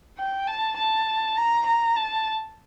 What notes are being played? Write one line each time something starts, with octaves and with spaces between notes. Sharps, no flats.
G5
A5
A5
A#5
A#5
A5